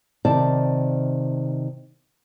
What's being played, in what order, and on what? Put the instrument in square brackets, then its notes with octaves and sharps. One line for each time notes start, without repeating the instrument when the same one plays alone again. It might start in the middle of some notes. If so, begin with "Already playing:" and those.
[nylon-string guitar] C3 D#3 D5 A5